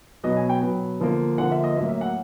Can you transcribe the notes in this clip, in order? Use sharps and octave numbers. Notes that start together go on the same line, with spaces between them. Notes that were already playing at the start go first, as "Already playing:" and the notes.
B2 F#3 B3 D#5
G#5
G5
B2 F#3 B3
D3 F3 A#3
D3 F3 A#3 F#5
E5
D#5
A2 F#3 A#3 E5
E5
F#5